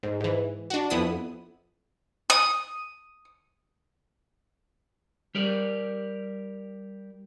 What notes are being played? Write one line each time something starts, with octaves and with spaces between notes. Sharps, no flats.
G#2
G#2 E3
D4 F#4
F2 B3 E4 B5 D#6
D#6
G3 G4 A#4 D5